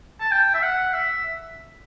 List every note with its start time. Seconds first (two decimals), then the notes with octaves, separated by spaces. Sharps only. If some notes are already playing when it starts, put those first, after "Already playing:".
0.20 A5
0.31 G5
0.54 E5
0.62 F#5
0.93 E5